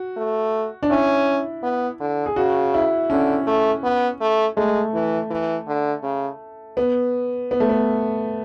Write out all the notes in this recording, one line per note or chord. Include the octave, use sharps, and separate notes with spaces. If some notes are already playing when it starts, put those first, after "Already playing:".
Already playing: F#4
A3
D4
C#4 E4
B3
D3
G#4
C#3 F#4
E4
D3 C#4
A3
B3
A3
G#3 A3
E3
E3
D3
C#3
B3
B3
A3
B3